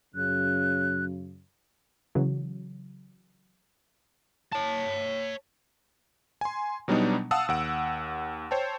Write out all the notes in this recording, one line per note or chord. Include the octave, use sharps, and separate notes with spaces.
F#2 C#3 F#6
C#3 E3 F#3
C#5 A5
G#5 C6
B2 F#3 G3 B3 D4 D#4
F5 F#5 A5 D#6 E6
D#2 F#5 D7
C5 C#5 G5 A5